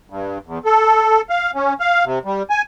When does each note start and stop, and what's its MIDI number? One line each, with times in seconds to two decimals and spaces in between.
0.10 0.38 43
0.47 0.58 40
0.65 1.21 69
1.30 1.51 77
1.55 1.73 61
1.80 2.04 77
2.05 2.19 48
2.25 2.43 55
2.50 2.62 80